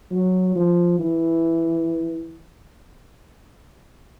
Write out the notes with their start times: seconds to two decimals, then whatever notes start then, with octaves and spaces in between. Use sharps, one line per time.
0.11 F#3
0.56 F3
0.99 E3